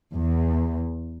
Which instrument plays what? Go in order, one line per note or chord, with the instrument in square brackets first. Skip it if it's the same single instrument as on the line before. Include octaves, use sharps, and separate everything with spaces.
[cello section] E2